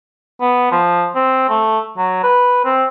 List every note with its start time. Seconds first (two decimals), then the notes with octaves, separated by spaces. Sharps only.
0.41 B3
0.71 F3
1.15 C4
1.49 A3
1.97 F#3
2.23 B4
2.65 C4